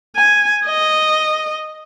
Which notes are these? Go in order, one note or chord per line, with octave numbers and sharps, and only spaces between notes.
G#5
D#5